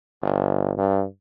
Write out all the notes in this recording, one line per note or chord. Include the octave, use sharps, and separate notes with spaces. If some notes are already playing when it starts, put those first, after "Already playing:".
G1
G2